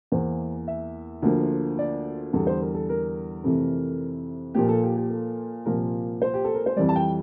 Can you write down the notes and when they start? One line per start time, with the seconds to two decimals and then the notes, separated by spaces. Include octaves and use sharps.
0.12 E2 E3 A#3 C5
0.68 E5
1.22 D2 D3 F3 A#3
1.79 D5
2.33 E2 D3 G3 A4
2.47 C5
2.61 A#4
2.74 A4
2.89 A#4
3.44 F2 C3 E3 A3
4.55 A#2 F3 A#3 G4
4.69 A4
4.83 G4
4.97 G4
5.10 A4
5.65 C2 A#2 F3 A#3 A#4
6.22 C5
6.34 G4
6.45 A4
6.55 A#4
6.66 C5
6.76 F2 E3 G3 D5
6.89 A5
6.96 G5